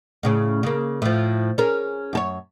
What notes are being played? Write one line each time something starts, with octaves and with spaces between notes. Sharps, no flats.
A2 C#3 C#4
C#3 A#3
A2 F3
C#4 G#4 A#4
F#2 A4 C#5